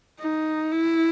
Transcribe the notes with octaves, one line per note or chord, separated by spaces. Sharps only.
D#4
E4